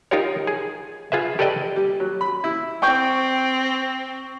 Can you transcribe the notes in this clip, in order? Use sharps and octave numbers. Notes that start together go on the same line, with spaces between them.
D#4 F4 G4 A#4 C#5
G#4
F4 G#4 B4 E5
G4 A4 B4 D5 D#5 G5
G3
F#3
B5
E4
C4 G5 C#6 G6